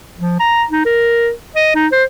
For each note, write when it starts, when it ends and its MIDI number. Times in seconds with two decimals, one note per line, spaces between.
0.18 0.37 53
0.40 0.65 82
0.71 0.85 63
0.85 1.31 70
1.56 1.72 75
1.75 1.87 63
1.92 2.04 72